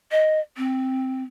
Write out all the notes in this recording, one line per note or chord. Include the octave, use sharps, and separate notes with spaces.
D#5
C4